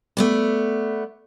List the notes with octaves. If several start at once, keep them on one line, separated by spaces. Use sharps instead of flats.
A3 B3 D5